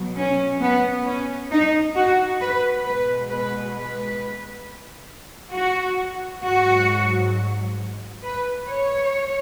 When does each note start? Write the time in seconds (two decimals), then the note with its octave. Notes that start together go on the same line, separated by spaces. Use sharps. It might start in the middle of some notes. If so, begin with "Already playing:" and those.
Already playing: B2 F#3
0.16 C#4
0.62 B3
1.07 C#4
1.51 D#4
1.96 F#4
2.41 B4
2.86 B2 G#3 B4
3.31 B4
3.75 B4
5.54 F#4
6.44 G#2 F#3 F#4
8.24 B4
8.68 C#5